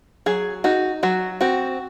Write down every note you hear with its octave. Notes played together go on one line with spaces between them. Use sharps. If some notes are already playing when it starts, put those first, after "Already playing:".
F#3 G#4
D#4 F#4
F#3 F#4
C4 F#4